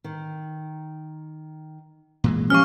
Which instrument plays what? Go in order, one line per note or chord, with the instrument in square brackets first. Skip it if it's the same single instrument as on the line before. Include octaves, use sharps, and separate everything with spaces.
[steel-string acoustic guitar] D#3
[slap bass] A#2 E3 G#3
[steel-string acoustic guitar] F3 G4 F5 [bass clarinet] C#4 [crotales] C#6 F6